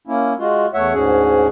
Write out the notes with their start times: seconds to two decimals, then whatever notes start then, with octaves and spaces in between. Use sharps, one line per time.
0.07 A#3 C#4 E4
0.39 G#3 F4 F#4
0.74 E2 A3 C#5 E5 F#5
0.93 D2 G#2 C#4 F#4 G#4